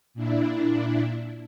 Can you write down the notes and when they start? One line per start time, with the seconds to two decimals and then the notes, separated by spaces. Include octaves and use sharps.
0.14 A#2 D4 E4